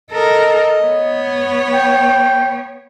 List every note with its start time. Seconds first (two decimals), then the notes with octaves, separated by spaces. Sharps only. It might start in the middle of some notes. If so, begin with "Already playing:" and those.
0.11 A4 A#4 D#5
0.83 B3 C#5
1.73 G5